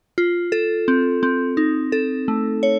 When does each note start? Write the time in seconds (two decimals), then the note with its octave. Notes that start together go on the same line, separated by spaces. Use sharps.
0.18 F4
0.52 A4
0.88 C4
1.23 C4
1.57 D#4
1.92 A4
2.28 A3
2.63 C#5